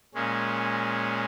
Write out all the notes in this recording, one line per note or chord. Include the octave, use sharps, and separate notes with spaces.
A#2 G#3 C#4